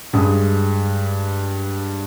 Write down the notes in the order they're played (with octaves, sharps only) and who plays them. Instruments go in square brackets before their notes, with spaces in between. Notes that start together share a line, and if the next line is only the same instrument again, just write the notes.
[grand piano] G2 G#3 D#6